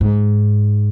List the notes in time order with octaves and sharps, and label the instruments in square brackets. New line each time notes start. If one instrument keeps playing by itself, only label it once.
[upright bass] G#2